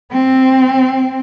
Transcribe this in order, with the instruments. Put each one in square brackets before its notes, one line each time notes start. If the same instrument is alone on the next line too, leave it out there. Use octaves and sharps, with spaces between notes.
[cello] C4